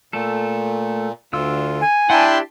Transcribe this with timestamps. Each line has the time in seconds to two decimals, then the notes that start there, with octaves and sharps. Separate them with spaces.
0.13 A#2 A3 A4
1.33 D2 D3 F4 E6
1.81 G#5
2.10 D4 E4 F#5 G5 A5 A#5 C6
2.22 G4